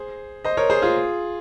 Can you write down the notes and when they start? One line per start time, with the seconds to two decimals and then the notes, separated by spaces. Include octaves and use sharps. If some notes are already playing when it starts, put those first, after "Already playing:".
Already playing: G#4 C5
0.44 C5 D#5
0.57 A#4 C#5
0.70 G#4 C5
0.82 F4 G#4